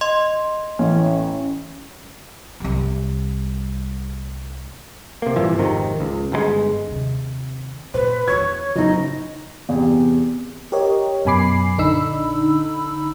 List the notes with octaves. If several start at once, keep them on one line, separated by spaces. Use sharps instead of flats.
D#5 C6
A1 C#4
C2 G3
C3 A#3
G2 A#2 E3 F3
G#1 F2 C3 D#3
C#2
G1 C3 G#3
D#2 C3
A#2 B4 C5
E2 E3 C#5 G#6
F#1 E2 A2 D#4 D#5
E2 C3
G4 A#4 C#5 D#5
F#2 B2 G#5 B5 D6 C7
A#1 D3 D4 D#4 B5 E6